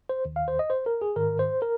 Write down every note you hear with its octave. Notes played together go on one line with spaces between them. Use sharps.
C5
D#2 D#3
F5
C5
D#5
C5
A#4
G#4
G#2 D#3 A#4
C5
A#4